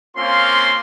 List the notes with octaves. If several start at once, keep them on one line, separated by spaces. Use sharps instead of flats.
A#3 C4 C#4 F4 F5 C6